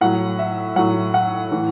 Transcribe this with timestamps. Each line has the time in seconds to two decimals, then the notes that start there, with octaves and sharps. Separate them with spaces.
0.01 A2 F#3 F#5
0.39 E5
0.76 A2 F#3 F#5
1.14 F#5
1.52 A2 E3